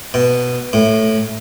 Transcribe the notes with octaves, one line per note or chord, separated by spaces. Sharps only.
B2
A2